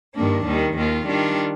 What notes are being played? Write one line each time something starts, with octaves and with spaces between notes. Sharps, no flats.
G2 D#3 A#3 D4
D#2 D#3 G3
D#2 D#3 A#3 F4
D#3 G3 D4 F4